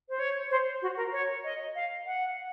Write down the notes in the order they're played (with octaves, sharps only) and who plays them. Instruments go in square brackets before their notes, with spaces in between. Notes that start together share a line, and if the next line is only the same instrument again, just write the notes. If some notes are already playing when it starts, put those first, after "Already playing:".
[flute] C5
C#5
C5
F#4
A#4
C#5
D#5
F5
F#5